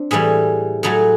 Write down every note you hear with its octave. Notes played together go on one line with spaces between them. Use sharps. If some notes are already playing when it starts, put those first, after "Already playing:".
Already playing: C4 D4
A2 E3 G3 G#4
A2 F#3 A3 G#4